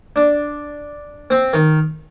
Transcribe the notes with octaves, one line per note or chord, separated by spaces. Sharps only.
D4
C4
D#3